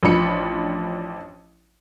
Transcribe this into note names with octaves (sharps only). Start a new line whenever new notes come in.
A1 F3 D4 B5 C#7